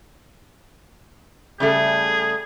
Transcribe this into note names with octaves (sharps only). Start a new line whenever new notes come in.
C#3 G3 A3 G#4